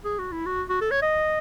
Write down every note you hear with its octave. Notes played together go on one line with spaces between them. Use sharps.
G#4
F#4
E4
F#4
F#4
A4
C#5
D#5